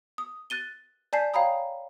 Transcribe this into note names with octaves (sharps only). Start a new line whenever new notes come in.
D#6
F#6 A6 D#7 G7
D5 G#5 A5 G6 B6 C7
C#5 F5 G5 A#5 B5 D#6